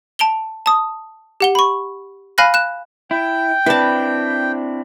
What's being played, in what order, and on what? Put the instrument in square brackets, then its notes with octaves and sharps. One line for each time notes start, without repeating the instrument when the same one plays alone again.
[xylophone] A5 D7 F7 G7
A5 D#6
G4 F#5 G7
B5 C#6
F5 G#5 B5 F6 F#6 A#6
F#6 E7
[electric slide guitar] E4 [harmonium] G5
[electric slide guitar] C4 D4 E4 [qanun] B4 A5